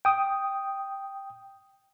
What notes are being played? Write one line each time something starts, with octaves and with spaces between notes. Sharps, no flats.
G5 D#6